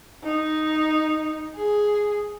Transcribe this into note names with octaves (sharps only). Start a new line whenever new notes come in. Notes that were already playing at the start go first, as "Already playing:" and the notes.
D#4
G#4